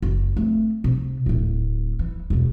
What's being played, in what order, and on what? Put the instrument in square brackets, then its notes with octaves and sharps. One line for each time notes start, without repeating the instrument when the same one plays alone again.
[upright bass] F#1
A3 C4
C3
D1 A2
E3
E1 C2